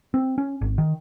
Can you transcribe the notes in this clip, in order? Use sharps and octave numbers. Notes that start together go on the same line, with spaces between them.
C4
C#4
G#1
D#3